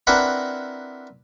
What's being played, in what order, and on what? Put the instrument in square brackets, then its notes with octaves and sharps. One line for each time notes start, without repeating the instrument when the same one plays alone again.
[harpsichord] C4 D4 E4 A#4 B4 F#5